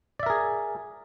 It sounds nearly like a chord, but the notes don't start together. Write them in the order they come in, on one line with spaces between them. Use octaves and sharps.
D5 E5 A#4 G#4